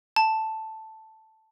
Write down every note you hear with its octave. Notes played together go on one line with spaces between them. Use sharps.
A5